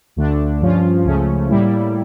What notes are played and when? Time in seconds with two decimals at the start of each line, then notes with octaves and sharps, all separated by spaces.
0.16 D2 D3 A3 D4
0.62 G2 F3 C#4 F4
1.05 C#2 C#3 F3 A3 C#4
1.49 A2 G3 A#3 E4